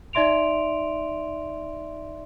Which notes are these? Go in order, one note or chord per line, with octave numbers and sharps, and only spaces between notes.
D#4 D5 E5 C6 D7 F7